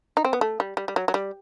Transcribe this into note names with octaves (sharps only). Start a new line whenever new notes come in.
D#4
C4
B3
A3
G3
G3
G3
F#3
F#3
G3